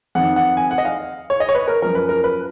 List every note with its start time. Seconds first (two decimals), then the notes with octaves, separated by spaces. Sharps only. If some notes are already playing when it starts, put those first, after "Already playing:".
0.15 F2 D#3 F#5
0.36 F#5
0.57 G#5
0.71 F#5
0.78 D#5
0.85 F5
1.30 C#5
1.40 D#5
1.49 C#5
1.55 B4
1.68 A#4
1.82 F#2 F3 A#4
1.95 B4
2.09 A#4
2.24 B4